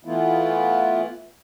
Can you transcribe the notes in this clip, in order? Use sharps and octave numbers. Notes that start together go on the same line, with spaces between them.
E3 A3 B3 E4 F4